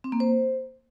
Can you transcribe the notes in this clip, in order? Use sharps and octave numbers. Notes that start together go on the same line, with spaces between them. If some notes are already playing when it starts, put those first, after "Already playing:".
C4
A#3
C5